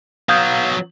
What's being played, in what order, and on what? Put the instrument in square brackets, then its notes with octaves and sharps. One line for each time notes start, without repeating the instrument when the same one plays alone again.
[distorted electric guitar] F#3 B3 [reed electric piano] F5 [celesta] D#6 G6 G#6